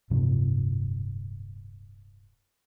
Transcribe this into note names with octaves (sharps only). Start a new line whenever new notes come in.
D1 G2 C3 F3